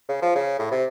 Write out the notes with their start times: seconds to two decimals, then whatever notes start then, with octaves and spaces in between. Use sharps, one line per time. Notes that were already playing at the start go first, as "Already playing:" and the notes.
0.09 C#3
0.22 F3
0.35 C#3
0.59 A2
0.71 C3